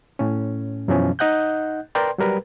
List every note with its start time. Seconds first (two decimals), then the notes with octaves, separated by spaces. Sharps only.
0.19 A2 C#4
0.88 F#2 B2 E3 F3 C#4
1.19 D#4 D#5 F#5 F#6 G6
1.95 A#4 B4 D5 G5 C6
2.18 F#3 G3 A#4 B4